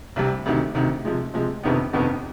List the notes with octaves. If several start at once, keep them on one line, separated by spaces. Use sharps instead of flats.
C2 C3 G3
D2 C3 D#3
D2 C3 D#3
C3 F3 G#3
C3 F3 G#3
G1 F2 C3 D#3 B3
G1 F2 C3 D#3 B3